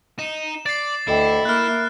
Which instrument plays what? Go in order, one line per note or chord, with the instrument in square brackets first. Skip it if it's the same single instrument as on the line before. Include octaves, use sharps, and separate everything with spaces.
[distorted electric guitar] D#4 [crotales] E7
[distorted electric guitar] D5 [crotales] A6 C7
[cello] D2 [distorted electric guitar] E4 [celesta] A4 D#5 G5
[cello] A#3 [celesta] A#4 E5 B5 [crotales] F6 F#6